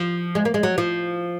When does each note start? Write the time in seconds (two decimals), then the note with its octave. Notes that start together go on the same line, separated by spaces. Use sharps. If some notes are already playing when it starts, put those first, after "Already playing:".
Already playing: F3
0.35 G#3
0.45 A#3
0.54 G#3
0.63 F#3
0.78 F3